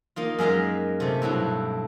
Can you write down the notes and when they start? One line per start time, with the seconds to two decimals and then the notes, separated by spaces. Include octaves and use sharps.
0.16 A#3 D#4 F4
0.39 F#2 G#3 A#4 D#5 F5
1.00 C3 A3
1.22 G2 B2 F#3 E4